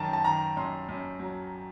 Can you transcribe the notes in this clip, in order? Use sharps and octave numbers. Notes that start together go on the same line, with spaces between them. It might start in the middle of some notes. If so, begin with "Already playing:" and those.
Already playing: F#2 D#3 A5 A#5
A5
D#3 A#5
F#2 C6
F#2
F#3